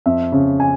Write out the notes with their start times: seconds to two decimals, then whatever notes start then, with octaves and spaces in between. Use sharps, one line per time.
0.06 F2 E5
0.32 C#3
0.60 G#5